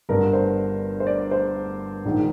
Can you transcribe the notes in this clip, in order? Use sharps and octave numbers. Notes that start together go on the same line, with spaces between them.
G1 G2 D3 A#4
C5
C5
D5
C5
A#1 G#2 D#3